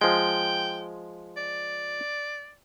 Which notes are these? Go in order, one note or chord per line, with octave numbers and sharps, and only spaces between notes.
F3 G#3 G5
D5